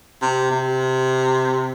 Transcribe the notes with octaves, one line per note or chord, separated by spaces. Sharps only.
C3
C3